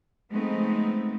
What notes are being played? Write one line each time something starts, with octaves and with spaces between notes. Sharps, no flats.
F3 G#3 A3 B3 C4 D#4